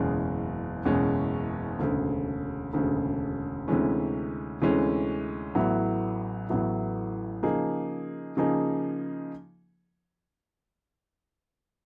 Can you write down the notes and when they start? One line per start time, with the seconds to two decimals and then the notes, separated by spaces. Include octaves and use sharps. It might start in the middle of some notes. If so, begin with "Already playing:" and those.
Already playing: F#1 E2 B2 G#3 C#4
0.85 F#1 E2 B2 G#3 C#4
1.79 E1 D2 C#3
2.73 E1 D2 C#3
3.68 D2 C3 E3 G#3 C#4
4.62 D2 C3 E3 G#3 C#4
5.55 A1 A2 F#3 B3 E4
6.49 A1 A2 F#3 B3 E4
7.43 C#3 F3 A#3 D#4 G#4
8.37 C#3 F3 A#3 D#4 G#4